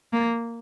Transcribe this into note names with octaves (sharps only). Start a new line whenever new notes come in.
A#3